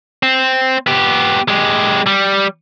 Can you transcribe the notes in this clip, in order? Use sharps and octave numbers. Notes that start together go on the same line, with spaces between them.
C4
B3 G4
G#3 G4
G3